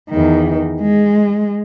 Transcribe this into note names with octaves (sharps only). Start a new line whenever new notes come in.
E2 D#3
G#3